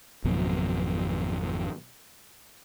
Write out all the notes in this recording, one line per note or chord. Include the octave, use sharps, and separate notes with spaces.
G#1 F2 B2 F#3